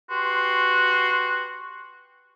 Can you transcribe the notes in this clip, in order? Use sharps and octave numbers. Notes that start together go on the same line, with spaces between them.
F#4 G4 B4 C6